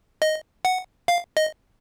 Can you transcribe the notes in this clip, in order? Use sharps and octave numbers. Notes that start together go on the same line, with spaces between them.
D#5
F#5
F5
D#5